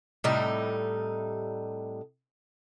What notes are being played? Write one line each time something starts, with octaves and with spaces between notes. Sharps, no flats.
A2 C3 G3 D#4